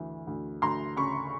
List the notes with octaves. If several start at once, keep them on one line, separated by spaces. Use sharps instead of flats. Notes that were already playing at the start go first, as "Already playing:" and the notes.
Already playing: D2 E3
D2
D2 A#5 C6
C#3 B5 C#6